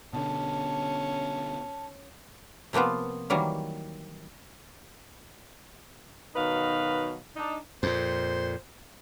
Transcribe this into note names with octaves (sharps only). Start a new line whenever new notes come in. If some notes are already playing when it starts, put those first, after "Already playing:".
B2 D3 C#4 A5
C3 F3 A#3 B3 F4
D#3 E3 F#3 G3 A#3
B2 D#3 F#3 D#4 B4 F5
D4 D#4
F2 A#2 C5